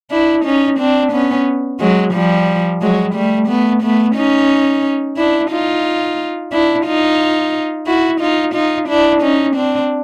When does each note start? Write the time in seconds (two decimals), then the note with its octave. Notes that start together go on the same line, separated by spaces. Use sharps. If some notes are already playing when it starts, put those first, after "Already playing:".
0.11 D4 E4
0.45 C#4 D#4
0.79 C4 D4
1.12 B3 C#4
1.80 F#3 G#3
2.13 F3 G3
2.82 F#3 G#3
3.14 G3 A3
3.48 A3 B3
3.83 A3 B3
4.16 C#4 D#4
5.17 D4 E4
5.50 D#4 F4
6.52 D4 E4
6.86 D#4 F4
7.87 E4 F#4
8.20 D#4 F4
8.54 D#4 F4
8.88 D4 E4
9.22 C#4 D#4
9.56 C4 D4